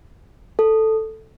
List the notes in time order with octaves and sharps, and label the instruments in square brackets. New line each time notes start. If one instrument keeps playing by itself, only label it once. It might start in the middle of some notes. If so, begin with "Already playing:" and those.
[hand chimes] A4